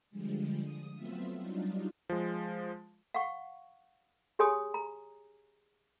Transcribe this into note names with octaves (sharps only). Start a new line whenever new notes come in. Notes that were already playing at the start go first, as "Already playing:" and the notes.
D3 F3 G3 G#3
D#6
F#3 A3 B3 C4 F4 E5
F#3 G3 D4 D#4 F4
F3 G#3
F5 F#5 C#6
G4 G#4 C#5 G#5 C6 D#6
A#5